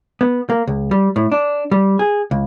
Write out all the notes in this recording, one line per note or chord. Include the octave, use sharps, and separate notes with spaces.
B3
A#3
C#2
G3
A2
D4
G3
G#4
C#2